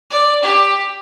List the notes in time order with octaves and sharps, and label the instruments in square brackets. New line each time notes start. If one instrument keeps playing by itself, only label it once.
[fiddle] D5
G4